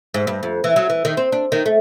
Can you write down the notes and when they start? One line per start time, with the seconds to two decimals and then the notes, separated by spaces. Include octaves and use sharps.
0.14 G#2
0.27 G2
0.43 F2
0.64 E3
0.76 F#3
0.90 E3
1.05 D#3
1.17 C4
1.32 D4
1.52 D#3
1.66 A3